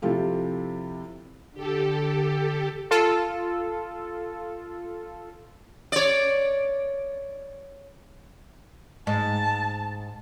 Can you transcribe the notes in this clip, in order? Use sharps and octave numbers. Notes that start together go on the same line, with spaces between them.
C3 F3 E4 F4 G4 A4
D3 G4 A4
F4 A4
C#5 D5
G#2 A5